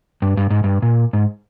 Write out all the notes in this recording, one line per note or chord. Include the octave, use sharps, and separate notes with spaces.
G2
G2
G#2
G2
A#2
G#2